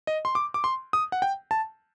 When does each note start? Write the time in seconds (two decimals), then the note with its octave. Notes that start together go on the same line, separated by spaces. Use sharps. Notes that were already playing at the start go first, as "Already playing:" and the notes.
0.07 D#5
0.25 C6
0.35 D6
0.54 D6
0.64 C6
0.93 D#6
1.12 F#5
1.22 G5
1.51 A5